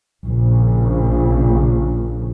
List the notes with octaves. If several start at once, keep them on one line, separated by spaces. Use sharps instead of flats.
A#1 C#3